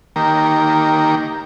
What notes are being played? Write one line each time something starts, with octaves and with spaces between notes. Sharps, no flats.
D#3 A#3 G4 A#4